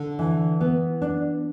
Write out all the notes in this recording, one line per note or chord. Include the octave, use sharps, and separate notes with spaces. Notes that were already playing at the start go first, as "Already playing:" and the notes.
Already playing: D3
E3
B3
D4